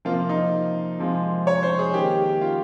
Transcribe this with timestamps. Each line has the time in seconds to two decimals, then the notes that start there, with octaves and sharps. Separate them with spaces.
0.05 C3 F3 A#3 F4
0.29 D#4
0.99 C3 F3 G#3
1.47 C#5
1.63 C5
1.79 G#4
1.94 D#3 A#3 G4
2.41 F4